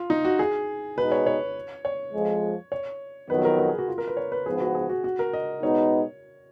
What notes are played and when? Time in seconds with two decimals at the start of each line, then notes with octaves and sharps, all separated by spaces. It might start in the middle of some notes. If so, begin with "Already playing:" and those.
Already playing: F4
0.10 D#4
0.25 F#4
0.39 G#4
0.97 B2 G#3 D#4 B4
1.12 C#5
1.26 C#5
1.85 C#5
2.13 F2 F3 G#3
2.72 C#5
3.30 F2 D#3 F#3 B3 B4
3.45 A#4
3.59 A#4
3.69 G#4
3.78 F#4
3.88 F4
3.98 A#4
4.07 B4
4.17 C#5
4.32 B4
4.46 G#2 F3 B3 G#4
4.60 F#4
4.75 G#4
4.90 F#4
5.04 F#4
5.19 A#4
5.33 D#5
5.62 B2 G#3 B3 D#4 C#5